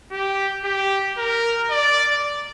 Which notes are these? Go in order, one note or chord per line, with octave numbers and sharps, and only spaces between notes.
G4
G4
A#4
D5